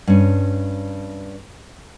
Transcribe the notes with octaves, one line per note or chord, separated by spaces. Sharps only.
G2 C#4